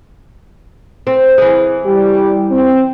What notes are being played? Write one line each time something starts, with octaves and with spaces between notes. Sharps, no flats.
C4
E3 G#4
G3 G4
C4